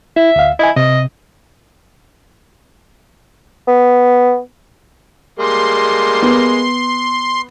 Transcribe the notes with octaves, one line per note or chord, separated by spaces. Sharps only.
E4 E5
D2 F5
E4 D#5 G#5
C3 D#5
B3
G3 G#3 A#3 C6
B3